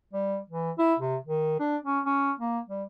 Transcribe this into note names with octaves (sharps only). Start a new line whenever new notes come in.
G3
E3
E4
C3
D#3
D4
C#4
C#4
A#3
G3